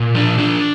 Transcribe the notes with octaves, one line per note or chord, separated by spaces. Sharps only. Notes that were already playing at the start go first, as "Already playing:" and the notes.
Already playing: A#2
F3 D4
F3 D4